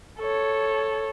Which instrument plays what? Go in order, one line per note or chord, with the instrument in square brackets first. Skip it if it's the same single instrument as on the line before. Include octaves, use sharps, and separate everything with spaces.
[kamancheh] A4 C#5